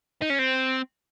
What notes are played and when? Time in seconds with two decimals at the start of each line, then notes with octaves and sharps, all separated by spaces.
0.22 D#4
0.30 C#4
0.39 C4